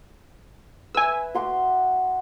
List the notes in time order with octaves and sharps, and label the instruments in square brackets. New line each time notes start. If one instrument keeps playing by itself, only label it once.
[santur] B4 E5 [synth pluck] G#5 E6
[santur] F#4 C6 D6